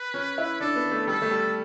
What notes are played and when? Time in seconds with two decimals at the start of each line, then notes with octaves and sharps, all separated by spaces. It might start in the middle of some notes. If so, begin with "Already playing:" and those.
Already playing: B4
0.14 C#4
0.38 E4
0.60 D4 A4
0.76 B3
0.91 A3
1.07 G3 A4
1.22 A3
1.31 G3